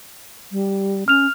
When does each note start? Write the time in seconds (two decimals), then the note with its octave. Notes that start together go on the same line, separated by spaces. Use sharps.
0.52 G3
1.08 C#4 F6 F7